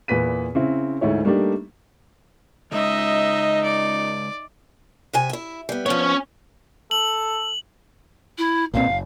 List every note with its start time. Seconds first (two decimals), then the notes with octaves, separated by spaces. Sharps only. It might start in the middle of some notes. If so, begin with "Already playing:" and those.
0.08 E2 A#2 B4 B6 D#7
0.55 C#3 C4 E4
1.01 D2 G#2 E4 C#5
1.25 G3 A3 A#3 D4 D#4 G4
2.72 C#3 G#3 D#4 D#5 E5
3.64 D5
5.13 C3 E5 G#5
5.30 E4 E5
5.69 G3 B3
5.86 F3 B3 C#4 C#5
6.91 A4 F#7
8.38 E4
8.74 B1 A#2 C4 F5
8.87 F#1